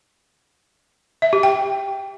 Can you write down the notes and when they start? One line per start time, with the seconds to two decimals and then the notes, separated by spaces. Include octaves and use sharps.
1.22 E5
1.33 G4
1.43 G5